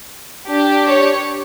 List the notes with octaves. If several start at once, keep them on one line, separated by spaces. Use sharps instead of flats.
D4 G4
C#5